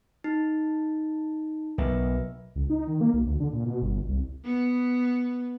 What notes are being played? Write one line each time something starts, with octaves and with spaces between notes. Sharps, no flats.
D#4
B1 A#4 B4 E5
C#2
D#4
D#3
A#3
B1
D2
D3
A#2
B2
G1
C2
B3